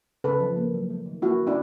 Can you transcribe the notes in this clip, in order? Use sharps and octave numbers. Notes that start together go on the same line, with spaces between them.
C#3 A4 B4
F3
A#3
F#3
A3
D#3
A#3 E4 F#4
D3
D4 E4